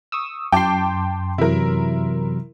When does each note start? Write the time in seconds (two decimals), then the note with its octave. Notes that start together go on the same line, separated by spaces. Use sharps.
0.12 C#6 D#6 E6
0.52 F#2 G5 A5 C6 D6
1.38 C3 E3 F#3 E4 A#4